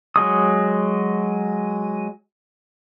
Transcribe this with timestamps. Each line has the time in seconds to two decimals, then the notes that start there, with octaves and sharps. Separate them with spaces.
0.16 F#3 G#3 D#6